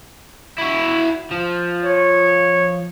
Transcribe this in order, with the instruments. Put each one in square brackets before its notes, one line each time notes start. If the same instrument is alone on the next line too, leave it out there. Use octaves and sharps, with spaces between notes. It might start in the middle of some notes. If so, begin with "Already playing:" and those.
[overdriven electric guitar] E4 F#4
F3
[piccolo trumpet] C#5